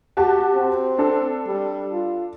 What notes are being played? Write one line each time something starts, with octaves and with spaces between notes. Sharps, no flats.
F#4 G4 A5
C4
D4 A4
G3
F4